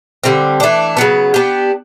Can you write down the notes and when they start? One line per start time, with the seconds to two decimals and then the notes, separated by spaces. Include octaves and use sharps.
0.24 D3 G3 C4
0.60 E3 A3 D4
0.97 C#3 F#3 B3
1.34 B3 D4 G4